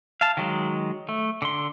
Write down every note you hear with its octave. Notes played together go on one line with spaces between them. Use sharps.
F5 A5
D#3 F#3 G#3
A3
D3 C6